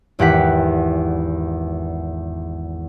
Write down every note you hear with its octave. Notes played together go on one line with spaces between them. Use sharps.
G#1 E2 G4 F#5 G5 B6